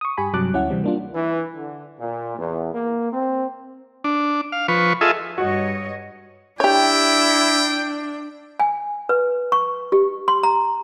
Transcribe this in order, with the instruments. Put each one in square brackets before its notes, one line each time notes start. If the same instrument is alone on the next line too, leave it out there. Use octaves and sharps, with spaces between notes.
[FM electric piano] C#6 D#6
G2 G4 G#5 B5
G2 C3 F#3 A5 D6 F#6
D2 C#4 E4 F#5
C3 E3 G3 C4
A#3 D4 F4
[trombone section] E3
D3
A#2
E2
A#3
C4
[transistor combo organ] D4
F5
F3 B4 C#6
F4 G#4 A4 D#5 E5
[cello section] G2 C#5 D#5 [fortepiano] F#4
[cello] D4 [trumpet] E4 [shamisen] G4 C#5 [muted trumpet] G5
[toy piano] G#5
B4
C#6
G4
C6
A#5